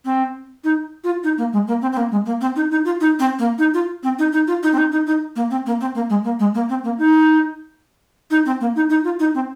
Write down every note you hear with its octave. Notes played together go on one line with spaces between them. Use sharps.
C4
D#4
F4
D#4
A#3
G#3
A#3
C4
C4
A#3
G#3
A#3
C4
D#4
D#4
F4
D#4
C4
A#3
D#4
F4
C4
D#4
D#4
F4
D#4
C4
D#4
D#4
D#4
A#3
C4
A#3
C4
A#3
G#3
A#3
G#3
A#3
C4
A#3
D#4
D#4
C4
A#3
D#4
D#4
F4
D#4
C4